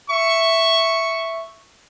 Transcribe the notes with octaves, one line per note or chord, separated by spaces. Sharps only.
E5 C#6